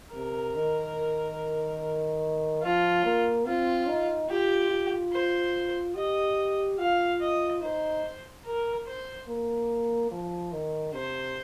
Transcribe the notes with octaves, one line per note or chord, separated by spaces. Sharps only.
C3 A#4
D#3
F3 F4
A#3
C4 F4
D#4
F4 G4
F4
C5
G4 D#5
F4 F5
D#5
D#4 C5
A#4
C5
A#3
F3
D#3
C3 C5